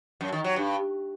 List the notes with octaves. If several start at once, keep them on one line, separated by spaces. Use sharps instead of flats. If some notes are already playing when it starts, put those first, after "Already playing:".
F#2
D#3
F#3
G2